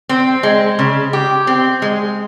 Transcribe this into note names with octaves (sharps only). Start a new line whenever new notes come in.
C4
G#3
C#3
G4
C4
G#3